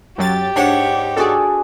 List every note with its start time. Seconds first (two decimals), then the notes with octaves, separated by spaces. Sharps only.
0.18 F#2 F#3 G4 A6
0.56 G#2 D4 C#5 F#5
1.16 D4 F#4 G#4 A4 D5